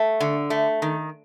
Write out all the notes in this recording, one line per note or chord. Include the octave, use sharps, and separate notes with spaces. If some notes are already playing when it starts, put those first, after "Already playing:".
Already playing: A3
D3
A3
D#3